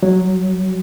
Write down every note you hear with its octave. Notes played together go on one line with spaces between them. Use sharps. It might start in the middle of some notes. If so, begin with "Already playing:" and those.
F#3